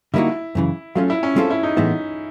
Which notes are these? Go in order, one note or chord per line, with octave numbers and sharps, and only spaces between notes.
D3 G3 A#3 D#4 E4 F#4
F#2 C#3 E3
F#3 A3 C#4 F4
E4
C#4
G#3 C4 F4 A4 C5
E4
D#4
A2 E3 G#3 B3 E4